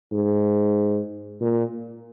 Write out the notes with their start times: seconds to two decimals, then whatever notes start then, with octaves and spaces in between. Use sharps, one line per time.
0.12 G#2
1.41 A#2